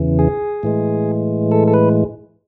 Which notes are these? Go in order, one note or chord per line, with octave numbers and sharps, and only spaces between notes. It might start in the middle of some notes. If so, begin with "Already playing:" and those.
Already playing: E2 C#3 E3
G#4
A2 E3 G#3
A4
A4
B4